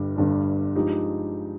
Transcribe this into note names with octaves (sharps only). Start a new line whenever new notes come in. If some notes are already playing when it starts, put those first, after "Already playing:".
Already playing: G1 G2 G3
G1 G2 G3
G2 F3 G#3 D#4 G4